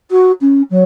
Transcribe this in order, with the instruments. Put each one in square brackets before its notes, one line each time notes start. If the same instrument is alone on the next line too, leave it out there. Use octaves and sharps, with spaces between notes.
[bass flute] F#4
C#4
F#3